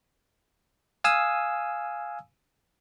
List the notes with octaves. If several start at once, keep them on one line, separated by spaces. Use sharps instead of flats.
F5 G#5 D#6 E6